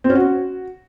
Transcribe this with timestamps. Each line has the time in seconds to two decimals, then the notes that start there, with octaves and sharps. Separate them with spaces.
0.04 C4
0.10 C#4
0.15 F#4